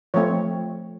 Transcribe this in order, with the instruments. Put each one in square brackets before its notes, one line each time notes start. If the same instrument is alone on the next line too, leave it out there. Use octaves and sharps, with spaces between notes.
[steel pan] F3 A3 C4 C#5